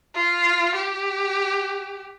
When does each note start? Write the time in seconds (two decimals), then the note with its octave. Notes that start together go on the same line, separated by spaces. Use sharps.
0.14 F4
0.75 G4